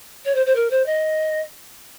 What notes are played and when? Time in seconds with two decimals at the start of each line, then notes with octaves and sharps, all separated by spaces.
0.25 C#5
0.34 C5
0.45 C5
0.55 A#4
0.70 C5
0.86 D#5